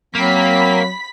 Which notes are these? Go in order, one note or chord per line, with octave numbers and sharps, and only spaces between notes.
F#3 A#3 C4 B5 B6